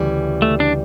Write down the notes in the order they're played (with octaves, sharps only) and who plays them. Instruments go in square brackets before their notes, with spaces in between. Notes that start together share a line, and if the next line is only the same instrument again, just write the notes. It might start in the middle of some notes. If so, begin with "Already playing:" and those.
Already playing: [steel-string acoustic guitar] D2 C#3 E3 G3
[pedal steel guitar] A3
D4